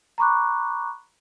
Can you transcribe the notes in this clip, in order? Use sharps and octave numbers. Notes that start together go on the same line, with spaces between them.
A#5 B5 C#6 D6 F#6